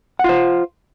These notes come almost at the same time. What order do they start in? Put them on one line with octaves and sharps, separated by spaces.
F#5 F4 C5